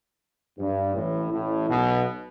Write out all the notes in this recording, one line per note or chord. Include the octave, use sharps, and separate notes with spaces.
G2
A1 A2
A1 A2
B1 B2